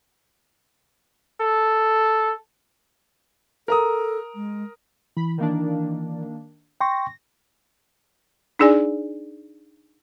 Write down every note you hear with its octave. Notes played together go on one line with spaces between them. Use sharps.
A4
A4 A#4 A#5 D#6
G#3
E3 B5
D#3 A#3 D4
G5 C6 C#6 A#6
D4 D#4 G#4 D5 G#5